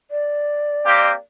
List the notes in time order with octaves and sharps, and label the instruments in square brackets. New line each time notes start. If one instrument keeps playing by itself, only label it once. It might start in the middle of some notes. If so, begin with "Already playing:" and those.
[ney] D5
[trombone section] A#3 C4 G4